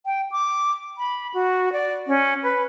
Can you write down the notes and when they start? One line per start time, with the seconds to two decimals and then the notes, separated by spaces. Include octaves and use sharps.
0.06 G5
0.32 D6
0.98 B5
1.34 F#4
1.72 D5
2.08 C#4
2.43 B4